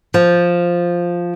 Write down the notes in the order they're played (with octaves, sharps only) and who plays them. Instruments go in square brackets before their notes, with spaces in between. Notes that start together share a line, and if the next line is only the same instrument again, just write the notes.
[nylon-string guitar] F3